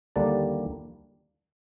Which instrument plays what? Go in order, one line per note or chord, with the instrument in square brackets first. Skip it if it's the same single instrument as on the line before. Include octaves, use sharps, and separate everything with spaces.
[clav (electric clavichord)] D#2 D3 G3 A#3 D4 A5